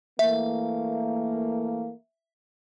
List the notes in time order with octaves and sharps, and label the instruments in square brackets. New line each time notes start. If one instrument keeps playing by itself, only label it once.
[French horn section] E3 A3 A#3 [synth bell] E5